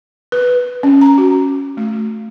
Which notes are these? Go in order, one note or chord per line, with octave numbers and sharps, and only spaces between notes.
B4
C#4
A#5
F#4
A3